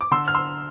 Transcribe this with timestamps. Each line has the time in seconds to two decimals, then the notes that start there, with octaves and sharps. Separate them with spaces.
0.01 D6
0.11 D3 C6 E6
0.28 F6
0.34 C6 E6